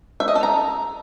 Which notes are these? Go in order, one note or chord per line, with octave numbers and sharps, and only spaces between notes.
E5
D#5
A4
A#5